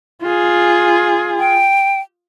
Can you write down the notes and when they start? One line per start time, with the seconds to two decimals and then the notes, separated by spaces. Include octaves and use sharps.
0.23 F4 G#4
1.39 G5